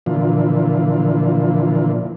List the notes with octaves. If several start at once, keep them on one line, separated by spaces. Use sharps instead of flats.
A#2 D3 E3 F3